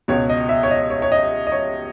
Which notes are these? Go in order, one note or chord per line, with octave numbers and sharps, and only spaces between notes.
C#2 B2 C#5
D#5
E5
C#5
D#5
C#5
C#5
D#5
D#5
C#5